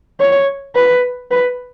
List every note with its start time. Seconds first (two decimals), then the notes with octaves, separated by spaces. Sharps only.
0.20 C#5
0.75 B4
1.31 B4